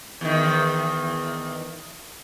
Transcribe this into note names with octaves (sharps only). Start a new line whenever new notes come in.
E2 D#3